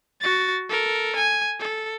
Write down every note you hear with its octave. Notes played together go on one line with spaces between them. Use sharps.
F#4 A6
A4 A#4
G#5
A4